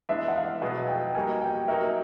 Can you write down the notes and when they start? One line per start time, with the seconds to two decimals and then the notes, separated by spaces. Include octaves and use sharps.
0.09 E3 G#3 B3 D4 E5
0.28 F#5
0.35 F5
0.62 B2 F#3 B3 E4 G#4 F#5
0.88 G5
1.14 G3 A#3 D#4 F#4 G#5
1.41 G5
1.68 F#3 A#3 D#4 F#4 A#4 E5